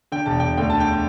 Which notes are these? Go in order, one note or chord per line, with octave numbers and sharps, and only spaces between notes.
D3 G5
E1 A5
E1 G5
D2 G5
D3 A5
G5
D3